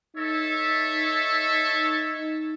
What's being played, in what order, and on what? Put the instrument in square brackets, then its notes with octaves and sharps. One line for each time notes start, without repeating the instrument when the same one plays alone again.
[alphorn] D#4 [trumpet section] A4 C#5 E5